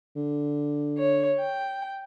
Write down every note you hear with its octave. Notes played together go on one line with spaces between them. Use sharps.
D3
C#5
G5